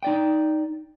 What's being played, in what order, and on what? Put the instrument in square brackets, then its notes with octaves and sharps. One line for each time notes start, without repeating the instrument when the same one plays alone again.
[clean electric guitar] D#4 D5 G5